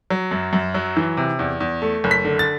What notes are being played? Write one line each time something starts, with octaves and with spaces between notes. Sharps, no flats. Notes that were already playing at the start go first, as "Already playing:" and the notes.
F#3
F#2
F#2
F#3
E3
C3
E2
E2
A3
F#1
B6
D3
A6